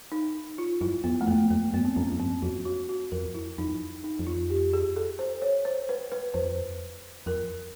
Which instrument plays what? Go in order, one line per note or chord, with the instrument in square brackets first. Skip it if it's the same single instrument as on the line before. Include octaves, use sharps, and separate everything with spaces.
[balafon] D#4
F4
[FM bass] F#2 [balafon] E4
[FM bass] F2 [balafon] B3
[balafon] A3
[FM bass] F2 [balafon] A#3
[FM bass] F2 [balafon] A#3
[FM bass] F#2 [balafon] B3
[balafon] C4
[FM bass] F2 [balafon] C#4
[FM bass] F2
[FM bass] F#2 [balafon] C4
[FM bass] F2 [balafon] F#4
[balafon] F#4
F#4
[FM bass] F2 [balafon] A#4
[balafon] E4
[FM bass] F2 [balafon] D#4
[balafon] D#4
[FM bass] F2
[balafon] F4
G4
G#4
A4
C5
C#5
C5
B4
B4
[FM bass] F2 [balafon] C5
[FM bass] F2 [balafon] A#4